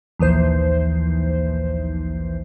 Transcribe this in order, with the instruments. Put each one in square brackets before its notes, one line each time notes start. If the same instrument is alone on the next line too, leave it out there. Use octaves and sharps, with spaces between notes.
[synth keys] A#1 D#2 E3 C5